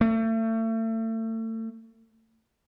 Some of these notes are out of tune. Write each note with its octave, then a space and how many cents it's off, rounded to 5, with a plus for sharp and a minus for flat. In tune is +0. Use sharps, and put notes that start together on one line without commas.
A3 +35